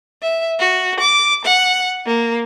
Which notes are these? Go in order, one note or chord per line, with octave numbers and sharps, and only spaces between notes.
E5
F#4
D6
F#5
A#3